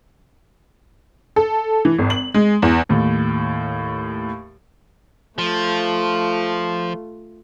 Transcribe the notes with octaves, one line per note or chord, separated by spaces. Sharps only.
A4
E3
G#1
F#7
G#3
E2
D#2 A2
F3 A3 F4